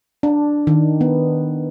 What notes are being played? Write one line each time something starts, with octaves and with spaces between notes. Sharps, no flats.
D4
D#3
B3